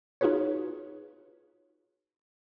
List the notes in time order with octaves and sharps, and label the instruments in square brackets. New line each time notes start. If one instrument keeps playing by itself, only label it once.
[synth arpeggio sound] D#4 F4 F#4 G#4 B4 C#5